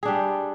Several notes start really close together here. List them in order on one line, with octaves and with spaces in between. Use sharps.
G#4 D4 G3